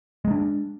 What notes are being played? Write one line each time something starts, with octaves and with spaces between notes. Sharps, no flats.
G#3 A#3 D4